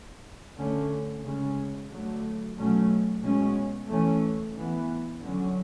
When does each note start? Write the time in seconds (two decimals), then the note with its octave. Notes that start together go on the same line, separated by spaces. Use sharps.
0.57 D3 A3 C#4
1.24 C#3 G#3 C#4
1.90 D3 F#3 A3
2.57 B2 F#3 A3 C#4
3.22 B2 G#3 C#4
3.89 E3 A3 C#4
4.55 E3 B3
5.22 D3 F#3 C#4